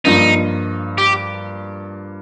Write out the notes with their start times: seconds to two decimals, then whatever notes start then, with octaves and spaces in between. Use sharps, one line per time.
0.05 G2 F3 A#3 D#4
0.98 G4